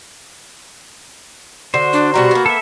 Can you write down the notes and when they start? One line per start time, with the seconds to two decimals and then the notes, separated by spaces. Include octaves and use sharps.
1.74 D3 F#4 C5
1.93 D4
2.14 B2 G3 F#4 A#5
2.31 A#3 B3
2.46 A4 E5